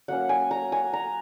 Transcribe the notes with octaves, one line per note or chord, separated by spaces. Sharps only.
F#3 A#3 C#4 F#5
G#5
A#5
G#5
A#5